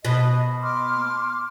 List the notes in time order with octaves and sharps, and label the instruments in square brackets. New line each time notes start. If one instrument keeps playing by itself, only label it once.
[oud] B2 [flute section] D#5
[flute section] C6 D6 F6